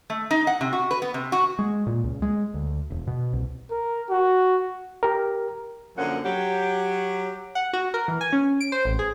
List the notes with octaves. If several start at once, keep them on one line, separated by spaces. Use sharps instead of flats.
A3
D#4
F#5
C3
F#4
B4
B3
C3
F#4
G#3
A#2
C#2
G#3
D2
E1
B2
C2
A#4
F#4
G4 A#4
F#2 D3 F3 A#3 C#4 F#5
F#3 G4
F#5
F#4
A#4
E3
G#5
C#4
D7
C5
A1
G#4